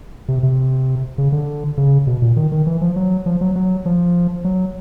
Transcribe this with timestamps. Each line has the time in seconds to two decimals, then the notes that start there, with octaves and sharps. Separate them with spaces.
0.28 C3
0.43 C3
1.18 C#3
1.32 D3
1.77 C#3
2.07 B2
2.22 A#2
2.37 D#3
2.52 D#3
2.67 E3
2.81 F3
2.96 F#3
3.26 F3
3.41 F#3
3.56 F#3
3.85 F3
4.44 F#3